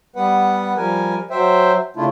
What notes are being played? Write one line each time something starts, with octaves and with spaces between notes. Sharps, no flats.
G3 B3 B4 F#5
F3 G3 A#4 G#5
F#3 C5 E5 G5
C#3 A3 D4 E4 F4